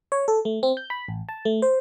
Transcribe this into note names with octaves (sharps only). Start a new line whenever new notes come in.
C#5
A4
A3
C4
G6
B5
A1
A5
A3
C5